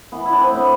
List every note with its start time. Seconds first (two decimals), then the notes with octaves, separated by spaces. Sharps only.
0.12 E3 B3
0.25 E4
0.31 E3 D4
0.41 C4
0.51 A2 B3